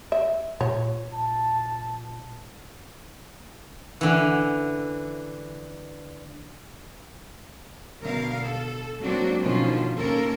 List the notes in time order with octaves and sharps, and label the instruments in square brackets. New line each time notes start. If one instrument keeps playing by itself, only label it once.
[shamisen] E5
[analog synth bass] A#2 [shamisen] C#5
[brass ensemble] A5
[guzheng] D3 E3
[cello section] B2 D3 A#4 F5
A4
G#2 F#3 A#3 C4 D4 F#4
B2 D3 D#3 F3 C#4 F4
D#2 A#3 C#4 A4 A#4